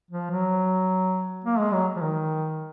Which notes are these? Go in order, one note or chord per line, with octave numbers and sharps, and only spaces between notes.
F3
F#3
A#3
G#3
F#3
F3
D#3